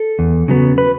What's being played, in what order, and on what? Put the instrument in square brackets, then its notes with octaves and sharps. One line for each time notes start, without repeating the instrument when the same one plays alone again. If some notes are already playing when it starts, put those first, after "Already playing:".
Already playing: [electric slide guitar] A4
E2
C#3 F#3 B3
B4